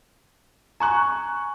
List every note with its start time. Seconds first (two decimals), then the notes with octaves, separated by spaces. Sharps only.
0.80 G#5 A#5 C#6 F#6